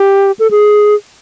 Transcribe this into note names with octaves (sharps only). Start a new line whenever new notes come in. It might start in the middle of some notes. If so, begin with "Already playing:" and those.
Already playing: G4
A4
G#4